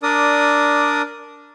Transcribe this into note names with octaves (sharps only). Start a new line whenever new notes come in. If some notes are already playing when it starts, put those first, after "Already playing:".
D4 A#4 D5 D#6